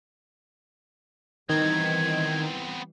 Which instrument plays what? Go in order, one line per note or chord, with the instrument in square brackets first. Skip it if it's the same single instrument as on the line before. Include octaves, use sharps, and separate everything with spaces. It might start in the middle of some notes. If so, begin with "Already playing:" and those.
[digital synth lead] D#3 [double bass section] E3 G3 [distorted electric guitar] B3 C4 [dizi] G#6